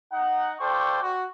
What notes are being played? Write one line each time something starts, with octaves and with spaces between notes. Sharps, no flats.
D#4 F#5
F4 A4 C5 D5 G5 C#6
F#4